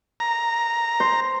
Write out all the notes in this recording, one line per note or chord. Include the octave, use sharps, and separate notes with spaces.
A#5
C5